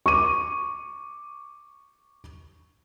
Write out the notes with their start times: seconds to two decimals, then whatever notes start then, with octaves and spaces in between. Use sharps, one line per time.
0.06 C#6 D6 D#7